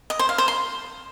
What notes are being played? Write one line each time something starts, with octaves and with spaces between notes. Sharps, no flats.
D#5
C5
F5
C5
C6